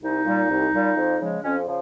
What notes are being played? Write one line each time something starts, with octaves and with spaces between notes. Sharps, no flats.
C2 D#4
A#2 G3
C2
A#2 G3
F2
C#3 F3 G#3
F2 C#4
C#3 F3